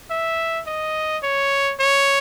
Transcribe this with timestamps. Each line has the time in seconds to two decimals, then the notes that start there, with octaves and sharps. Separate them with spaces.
0.10 E5
0.67 D#5
1.23 C#5
1.80 C#5